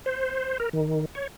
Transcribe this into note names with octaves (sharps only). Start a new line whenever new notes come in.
C5
A#4
D#3
C#5